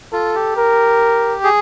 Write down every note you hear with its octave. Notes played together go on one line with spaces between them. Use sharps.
F4 A4
G4
A#4
G#4